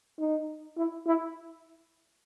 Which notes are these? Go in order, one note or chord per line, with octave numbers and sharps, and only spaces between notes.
D#4
E4
E4